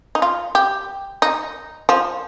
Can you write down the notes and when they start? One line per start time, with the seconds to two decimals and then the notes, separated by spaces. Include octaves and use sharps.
0.15 D#4
0.22 F4
0.55 G4
1.22 D#4
1.89 F3